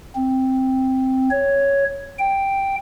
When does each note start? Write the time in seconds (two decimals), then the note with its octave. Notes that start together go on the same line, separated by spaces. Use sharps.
0.16 C4
1.30 C#5
2.18 G5